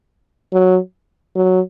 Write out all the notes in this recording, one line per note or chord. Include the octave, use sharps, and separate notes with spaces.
F#3
F#3